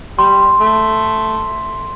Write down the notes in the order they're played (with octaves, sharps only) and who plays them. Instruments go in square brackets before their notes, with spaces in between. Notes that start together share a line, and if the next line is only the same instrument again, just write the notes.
[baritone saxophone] G3 [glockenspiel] C6
[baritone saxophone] A3